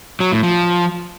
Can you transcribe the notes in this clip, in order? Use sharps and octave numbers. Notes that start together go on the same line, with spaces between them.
F#3
A2
F3